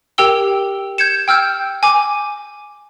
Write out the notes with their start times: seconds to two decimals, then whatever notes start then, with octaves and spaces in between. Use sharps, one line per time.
0.18 G4 A#4 G5 E6 G7
0.98 G6 G#6 C#7 E7
1.28 G5 E6 F6 G6
1.83 G#5 D6